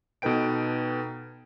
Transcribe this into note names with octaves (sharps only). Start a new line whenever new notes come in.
B2 D#4 A4 B4 G5 D7